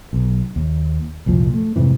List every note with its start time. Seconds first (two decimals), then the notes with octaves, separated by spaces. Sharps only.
0.13 B1
0.56 D#2
1.26 C2 F2 A#2 F3
1.54 A3
1.76 F2 G#2 C3 E3